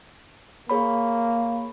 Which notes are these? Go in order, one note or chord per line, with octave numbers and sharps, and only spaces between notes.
A#3 G#4 C#5 B5